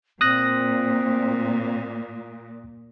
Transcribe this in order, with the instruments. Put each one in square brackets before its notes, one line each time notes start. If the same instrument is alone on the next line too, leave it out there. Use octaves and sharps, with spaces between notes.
[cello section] A#2 [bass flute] C4 [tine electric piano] D#6 F#6 A#6